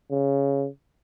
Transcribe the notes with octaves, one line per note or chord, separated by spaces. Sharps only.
C#3